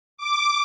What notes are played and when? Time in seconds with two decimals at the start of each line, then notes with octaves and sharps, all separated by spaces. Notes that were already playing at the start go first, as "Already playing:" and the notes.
0.18 D6